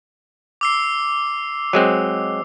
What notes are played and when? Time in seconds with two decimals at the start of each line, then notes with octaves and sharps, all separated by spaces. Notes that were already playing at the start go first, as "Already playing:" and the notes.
0.61 D6 E6 C7
1.73 F#3 G#3 C4